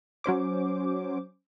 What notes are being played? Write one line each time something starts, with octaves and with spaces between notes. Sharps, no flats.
F#3 C#4 C5 D6